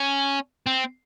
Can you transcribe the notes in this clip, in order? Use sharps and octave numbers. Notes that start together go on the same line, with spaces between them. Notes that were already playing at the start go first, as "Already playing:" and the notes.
Already playing: C#4
C4